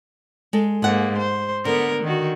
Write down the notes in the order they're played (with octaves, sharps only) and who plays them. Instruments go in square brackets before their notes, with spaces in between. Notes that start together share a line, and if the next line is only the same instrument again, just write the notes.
[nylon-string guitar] G#3 A4
[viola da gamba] G#2 A#3 [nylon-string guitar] G#4 F#5
[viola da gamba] C5
[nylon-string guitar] D3 [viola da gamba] B3 A#4
[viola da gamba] D#3 F#4